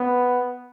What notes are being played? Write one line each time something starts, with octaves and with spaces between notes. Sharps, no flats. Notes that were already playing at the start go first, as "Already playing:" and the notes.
Already playing: B3